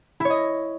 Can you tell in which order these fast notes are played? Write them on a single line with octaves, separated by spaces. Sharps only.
E4 C#5 D#5